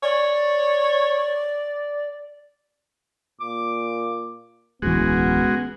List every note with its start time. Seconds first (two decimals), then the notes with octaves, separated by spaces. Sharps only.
0.03 C#5 D5
3.40 A#2 D6
4.82 D1 B1 E3 G#3 B3 C#4 F#4